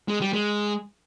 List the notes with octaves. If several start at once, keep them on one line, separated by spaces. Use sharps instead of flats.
G#3
G3
G#3